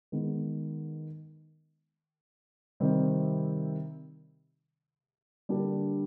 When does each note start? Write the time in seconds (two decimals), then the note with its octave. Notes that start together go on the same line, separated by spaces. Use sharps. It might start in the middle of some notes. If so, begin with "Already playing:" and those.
0.12 D#3 G#3 B3
2.80 C3 D#3 G3 C4
5.49 D3 G3 A#3 D4 G4